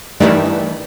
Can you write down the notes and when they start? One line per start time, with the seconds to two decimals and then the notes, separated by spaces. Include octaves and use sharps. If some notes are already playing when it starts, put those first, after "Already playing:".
0.20 G2 D#3 E3 A3 G4 D5